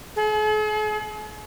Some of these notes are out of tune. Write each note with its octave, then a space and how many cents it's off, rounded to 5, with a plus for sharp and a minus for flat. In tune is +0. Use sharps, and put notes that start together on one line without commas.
G#4 +45